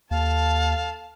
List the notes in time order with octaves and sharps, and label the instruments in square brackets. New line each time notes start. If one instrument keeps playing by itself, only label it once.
[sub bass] D#2 [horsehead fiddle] A4 A5 [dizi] F5